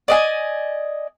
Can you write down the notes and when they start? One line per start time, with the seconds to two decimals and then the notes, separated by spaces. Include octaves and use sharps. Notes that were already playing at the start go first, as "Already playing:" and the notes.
0.08 D5 D#5 G#5